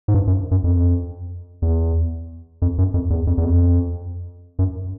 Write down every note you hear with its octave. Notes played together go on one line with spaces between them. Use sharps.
G#2
G2
F#2
F#2
F2
E2
F2
F#2
F2
E2
F2
E2
F2
F#2